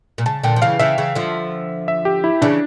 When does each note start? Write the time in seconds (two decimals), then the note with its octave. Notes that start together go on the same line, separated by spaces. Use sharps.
0.18 A#2
0.26 C#3 A5
0.43 A#2 D3 G5
0.56 F3
0.62 C#3 E3 F5
0.79 C#3 E3 E5
0.98 C#3 E3
1.15 D3 F3
1.88 E5
2.05 G4
2.24 E4
2.42 C#3 E3 D4